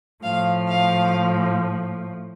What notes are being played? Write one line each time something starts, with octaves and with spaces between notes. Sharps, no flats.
A2 F3 F5
F5